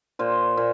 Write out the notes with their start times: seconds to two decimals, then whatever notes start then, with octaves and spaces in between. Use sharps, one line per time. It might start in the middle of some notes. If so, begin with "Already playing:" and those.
0.19 A#2 C5
0.57 A#2